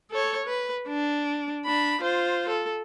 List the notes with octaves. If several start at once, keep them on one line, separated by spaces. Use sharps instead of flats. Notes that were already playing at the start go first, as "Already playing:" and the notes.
A4 C#5
B4
D4
D4 B5
F4 C5
A4